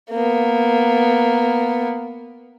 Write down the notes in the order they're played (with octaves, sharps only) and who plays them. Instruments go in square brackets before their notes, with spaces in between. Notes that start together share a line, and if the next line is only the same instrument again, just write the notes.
[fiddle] A#3 B3